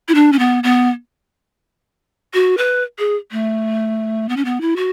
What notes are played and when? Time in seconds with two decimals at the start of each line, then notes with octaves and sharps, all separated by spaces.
0.08 E4
0.14 D4
0.32 C#4
0.39 B3
0.63 B3
2.34 F#4
2.58 B4
2.98 G#4
3.32 A3
4.29 B3
4.37 C#4
4.45 B3
4.61 E4
4.76 F#4